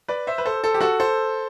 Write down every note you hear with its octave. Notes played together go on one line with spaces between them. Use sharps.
B4 D5
C5 E5
B4
A4 C5
A4 C5
G4
F#4 A4
A4 C5